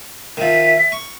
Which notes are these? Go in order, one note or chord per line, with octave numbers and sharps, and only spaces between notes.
D#3 F3 E5
C#6